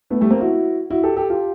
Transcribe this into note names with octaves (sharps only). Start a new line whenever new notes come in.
A3 B3
G3 A3
A#3 C4
E4 F#4
E4 F#4
G4 A4
G4 A4
F4 G4